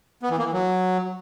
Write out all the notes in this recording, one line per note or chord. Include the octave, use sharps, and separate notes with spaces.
B3
E3
A#3
E3
F#3